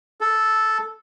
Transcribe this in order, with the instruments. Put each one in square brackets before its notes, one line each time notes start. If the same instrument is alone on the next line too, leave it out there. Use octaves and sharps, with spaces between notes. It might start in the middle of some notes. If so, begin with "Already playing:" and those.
[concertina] A4